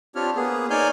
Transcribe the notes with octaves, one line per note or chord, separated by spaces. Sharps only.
C4 D4 F4 G4 C#5 F6
A#3 B3 G#4
D#4 C#5 D5 G#5 F6 G6